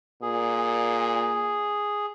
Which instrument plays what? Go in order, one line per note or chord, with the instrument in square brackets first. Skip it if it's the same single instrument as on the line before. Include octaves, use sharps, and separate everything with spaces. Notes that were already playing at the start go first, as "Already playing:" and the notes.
[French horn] A#2 [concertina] G#4